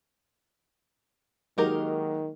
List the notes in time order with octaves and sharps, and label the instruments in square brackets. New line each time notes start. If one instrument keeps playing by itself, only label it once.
[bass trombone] D#3 [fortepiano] F#3 G#3 A#3 [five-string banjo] D#4 G4 A#4